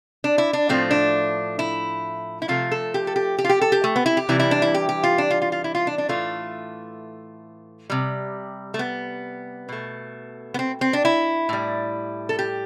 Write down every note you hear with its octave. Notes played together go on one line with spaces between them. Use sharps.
D4
E4
D4
A2 F3 A3 C4
D4
E4
E4
C3 F3 A3 F4
A4
G4
A4
G4
G4
F4
G4
A4
G4
A3
B3
E4
G4
C3 E3 G3 E4
E4
D4
E4
G4
G4
F4
D4
F4
F4
F4
E4
F4
D4
D4
A2 E3 A3 F4
C3 G3
A3
B3
B2 A3
B3
C4
C4
D4
E4
A2 G3
A4
G4